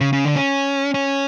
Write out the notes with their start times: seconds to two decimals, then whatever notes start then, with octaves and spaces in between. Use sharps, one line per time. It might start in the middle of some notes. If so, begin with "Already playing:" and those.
0.01 C#3
0.13 C#3
0.25 D3
0.36 C#4
0.94 C#4